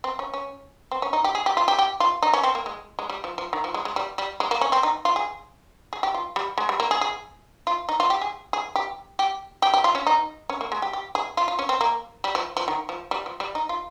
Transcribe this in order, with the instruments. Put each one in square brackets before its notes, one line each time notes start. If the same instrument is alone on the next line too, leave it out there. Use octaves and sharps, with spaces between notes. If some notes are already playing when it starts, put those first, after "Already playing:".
[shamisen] C4
C#4
C#4
C4
C#4
D#4
G4
G#4
G4
F4
G4
G4
F4
D#4
C#4
C4
A#3
G#3
G#3
G3
F3
F3
D#3
F3
G#3
G#3
G3
G3
G#3
A#3
C#4
C4
D#4
F4
G#4
G#4
G4
F4
G3
G#3
G3
A#3
G#4
G#4
F4
D#4
F4
G4
G#4
G#4
G4
G4
G4
G4
F4
C#4
D#4
C#4
A#3
G#3
G4
G4
G#4
F4
F4
C#4
C4
A#3
G3
F3
F3
D#3
F3
G3
F3
G3
D#4
F4